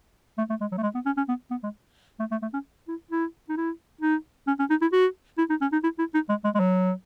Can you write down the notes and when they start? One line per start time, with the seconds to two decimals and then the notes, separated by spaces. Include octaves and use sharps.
0.38 A3
0.50 A3
0.61 G#3
0.72 F#3
0.78 A3
0.83 G#3
0.95 B3
1.06 C#4
1.17 C#4
1.29 B3
1.51 B3
1.63 G#3
2.20 A3
2.31 A3
2.42 A3
2.54 C#4
2.88 E4
3.11 E4
3.49 D#4
3.57 E4
4.01 D#4
4.47 C#4
4.59 C#4
4.70 D#4
4.82 E4
4.93 F#4
5.38 E4
5.50 D#4
5.62 C#4
5.73 D#4
5.83 E4
5.99 E4
6.14 D#4
6.29 G#3
6.44 G#3
6.55 G#3
6.60 F#3